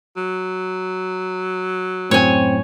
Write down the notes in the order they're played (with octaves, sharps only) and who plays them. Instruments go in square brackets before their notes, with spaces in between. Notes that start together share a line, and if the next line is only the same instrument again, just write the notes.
[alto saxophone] F#3
[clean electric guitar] F#2 A2 [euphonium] C4 [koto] C#5 G#5